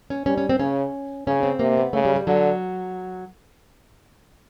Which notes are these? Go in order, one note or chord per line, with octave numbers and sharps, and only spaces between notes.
C#4
G3 C#4
C#4
C4
C#3 C#4
C#3 C#4
C4
C3 A#3
B3
C#3 A3
G3
G3
D3 F#3